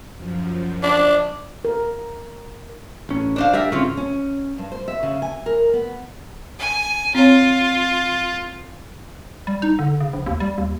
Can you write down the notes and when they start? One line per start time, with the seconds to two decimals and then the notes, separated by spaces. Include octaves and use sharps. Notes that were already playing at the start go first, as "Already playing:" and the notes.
0.16 F#2 F3
0.83 D4
1.65 A#4
3.09 A1 C#4
3.36 D4 C5 F5
3.53 G3 A#4 E5 F5
3.72 G#1 C#3 C4 C#4 F4
3.97 C#4
4.58 G2
4.72 C5
4.88 E5
5.03 C#3
5.22 G#5
5.46 A#4
5.73 B3
6.59 G#5
7.15 C4 F4 C#5
9.47 G3
9.62 D#4
9.79 D3
10.00 C#3
10.13 A#1
10.26 D#2
10.40 G3
10.58 D#2